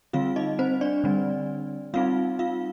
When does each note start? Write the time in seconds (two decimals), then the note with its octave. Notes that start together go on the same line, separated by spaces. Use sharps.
0.13 D3 G3 C4 F4 F5
0.36 D#4 D#5
0.59 C4 C5
0.81 D4 D5
1.04 D3 G3 C4
1.94 G3 C4 D#4 F4 F5
2.39 F4 F5